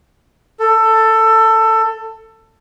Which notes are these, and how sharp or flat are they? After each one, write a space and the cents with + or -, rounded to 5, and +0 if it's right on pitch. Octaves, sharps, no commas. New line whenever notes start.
A4 +15